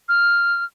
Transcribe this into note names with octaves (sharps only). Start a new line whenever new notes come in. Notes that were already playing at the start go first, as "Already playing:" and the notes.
F6